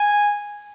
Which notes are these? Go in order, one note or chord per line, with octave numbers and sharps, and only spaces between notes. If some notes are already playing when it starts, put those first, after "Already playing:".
Already playing: G#5